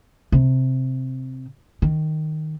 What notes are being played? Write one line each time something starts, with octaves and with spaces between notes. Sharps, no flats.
C3
D#3